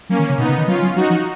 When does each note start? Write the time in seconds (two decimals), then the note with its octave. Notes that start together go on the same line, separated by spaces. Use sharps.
0.09 F#3 A#3 C#4
0.19 D#3
0.29 C#3
0.38 B2 B3 D#4
0.49 C#3
0.58 D#3
0.67 F#3 C#4 F4
0.82 F#3
0.95 F#3 D#4 F#4
1.10 F3